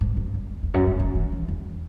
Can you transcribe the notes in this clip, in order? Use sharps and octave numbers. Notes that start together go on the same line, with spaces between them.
G#2
F#2
E2
E2
F#2
G#2
D#3
E3
D#3
E2